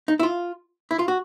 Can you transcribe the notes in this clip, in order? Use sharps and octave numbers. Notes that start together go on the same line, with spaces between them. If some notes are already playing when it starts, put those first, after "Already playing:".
D#4
E4
F4
E4
F4
F#4